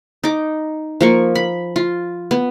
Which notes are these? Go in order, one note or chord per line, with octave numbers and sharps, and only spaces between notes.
D#4 D6
F3 A#3 C#6
B5
F4
B3